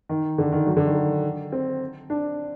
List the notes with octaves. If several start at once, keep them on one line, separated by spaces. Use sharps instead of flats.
D#3
D3
D#3
F#3
D3
D#3
C4
D4